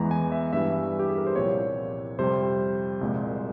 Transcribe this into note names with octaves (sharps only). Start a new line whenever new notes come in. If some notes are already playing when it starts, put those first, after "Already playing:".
Already playing: E2 E3 G#3 A#5
G#5
E5
G2 E3 G3 E5
G4
G#4
A#4
C5
C2 A#2 F3 C#5
F2 C3 G3 C5
C2 A#2 G#3